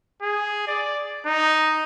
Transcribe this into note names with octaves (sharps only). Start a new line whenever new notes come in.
G#4
D5
D#4